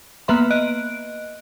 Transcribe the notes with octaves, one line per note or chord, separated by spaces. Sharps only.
A#3 B3 B4 E5 C6
D#5 F#6 D7